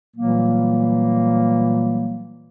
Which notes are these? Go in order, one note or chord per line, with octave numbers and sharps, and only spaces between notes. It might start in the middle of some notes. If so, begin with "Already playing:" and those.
A#2 E3 F#3 G3 A#3